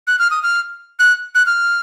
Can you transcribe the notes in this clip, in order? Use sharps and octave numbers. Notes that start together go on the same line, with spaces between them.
F#6
F6
D#6
F6
F#6
F#6
F6